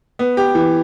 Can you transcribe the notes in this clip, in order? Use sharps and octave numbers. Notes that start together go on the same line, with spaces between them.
B3
G4
E3